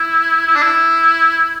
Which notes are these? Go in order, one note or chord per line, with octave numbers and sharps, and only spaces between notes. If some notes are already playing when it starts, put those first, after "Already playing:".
Already playing: E4
E4
D4
E4